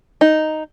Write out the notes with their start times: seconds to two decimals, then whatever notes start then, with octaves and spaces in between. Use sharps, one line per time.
0.21 D#4